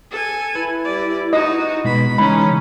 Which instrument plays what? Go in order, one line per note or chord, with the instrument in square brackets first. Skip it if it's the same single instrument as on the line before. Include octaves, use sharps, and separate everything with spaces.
[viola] A4 G#5
[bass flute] E4 [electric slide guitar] B4
[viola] G3 D5
[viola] D#4 F#4 [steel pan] D#5
[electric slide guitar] B2 G#3 D#4 [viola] B3 B5
[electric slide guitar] C#3 E3 G#3 [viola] C#4 [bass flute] D#4 [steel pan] B5